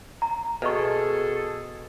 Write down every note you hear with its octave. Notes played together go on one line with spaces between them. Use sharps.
A#5
B2 G#4 A4 B4 D#5 C#6